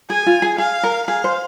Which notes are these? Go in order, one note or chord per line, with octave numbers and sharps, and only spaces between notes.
G#4 G#5
F4
G#4
G#4 F5
A#4
G#4 F5
C5